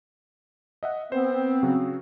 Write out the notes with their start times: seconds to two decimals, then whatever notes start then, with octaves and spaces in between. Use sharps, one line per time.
0.83 D#5 E5 F#5
1.12 B3 C4 C5
1.63 C#3 F#3